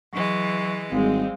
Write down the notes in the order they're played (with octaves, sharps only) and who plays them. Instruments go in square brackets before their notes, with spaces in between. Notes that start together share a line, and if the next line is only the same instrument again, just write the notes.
[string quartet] E3 G#3 [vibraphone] F#3 C#6
[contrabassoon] G#1 [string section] G3 G#3 C4 [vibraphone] F5